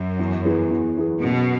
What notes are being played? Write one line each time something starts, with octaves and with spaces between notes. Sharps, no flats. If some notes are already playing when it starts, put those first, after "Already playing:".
Already playing: F#2
E2
E3 B3 G#4
E2
E3 B3 G#4
F#2 B2